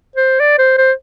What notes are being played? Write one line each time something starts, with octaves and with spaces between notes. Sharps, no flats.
C5
D5
C5
C5